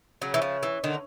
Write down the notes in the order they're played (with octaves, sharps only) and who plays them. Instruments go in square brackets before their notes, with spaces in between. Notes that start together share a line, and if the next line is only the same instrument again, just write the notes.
[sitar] C#3 [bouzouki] F#3
[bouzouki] E3
F3
E3
[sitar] D3 [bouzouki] D#3